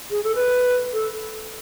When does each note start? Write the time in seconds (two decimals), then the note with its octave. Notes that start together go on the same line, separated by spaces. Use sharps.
0.10 G#4
0.24 A4
0.35 B4
0.93 A4